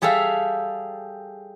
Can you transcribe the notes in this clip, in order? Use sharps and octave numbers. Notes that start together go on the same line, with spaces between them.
G3 G#4 A4 E5 F5